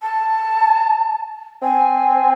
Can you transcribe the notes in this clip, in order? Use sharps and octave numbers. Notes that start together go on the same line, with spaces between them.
A5
C4 G#5